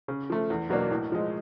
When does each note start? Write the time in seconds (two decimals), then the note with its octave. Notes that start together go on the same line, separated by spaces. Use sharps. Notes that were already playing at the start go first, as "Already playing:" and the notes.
0.08 C#3
0.30 F3 A3
0.50 E2
0.70 B2 F#3 A#3 D4
0.91 A2
1.12 F3 G#3